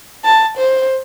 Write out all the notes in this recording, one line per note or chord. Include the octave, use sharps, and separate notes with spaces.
A5
C5